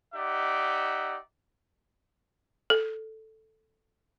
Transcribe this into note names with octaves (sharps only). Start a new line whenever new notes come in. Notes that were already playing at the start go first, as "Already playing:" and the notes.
D#4 G4 D5 E5 F#5
A4